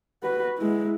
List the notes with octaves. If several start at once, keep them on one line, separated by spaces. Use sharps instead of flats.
F#4 B4
G#3 E4